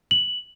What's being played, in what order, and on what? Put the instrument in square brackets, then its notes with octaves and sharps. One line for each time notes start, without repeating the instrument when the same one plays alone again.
[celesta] F#7